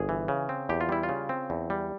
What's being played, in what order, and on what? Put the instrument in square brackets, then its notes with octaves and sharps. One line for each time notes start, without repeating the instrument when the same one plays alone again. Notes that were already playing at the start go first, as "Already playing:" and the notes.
Already playing: [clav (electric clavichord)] G1 G#4
E3
C#3
C4
E2 G4
F4
G3 E4
F4
C#3
C4
E2
G3